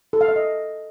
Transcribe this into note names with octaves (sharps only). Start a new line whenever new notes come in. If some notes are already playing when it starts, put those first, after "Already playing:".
A4
F5
E5
D#5